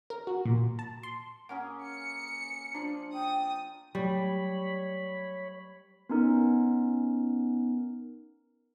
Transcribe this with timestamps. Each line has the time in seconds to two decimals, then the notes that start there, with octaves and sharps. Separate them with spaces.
0.10 A#4
0.27 F#4
0.45 A#2
0.79 A5
1.03 C6
1.49 A#3 C#4 G#4 F#5
1.84 C#7
2.74 F3 D4 D5
3.14 G5 D#6
3.95 F#3 G3 A3 C#5 B5
6.09 B3 C#4 D#4 A#4